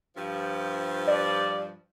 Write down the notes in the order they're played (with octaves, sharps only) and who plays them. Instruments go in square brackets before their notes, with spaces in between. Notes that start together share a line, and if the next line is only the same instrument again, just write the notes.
[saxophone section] G2 F3
[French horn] D5